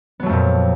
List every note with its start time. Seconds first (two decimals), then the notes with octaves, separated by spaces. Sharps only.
0.20 B3
0.23 F#3
0.26 A3
0.29 F2
0.33 A#2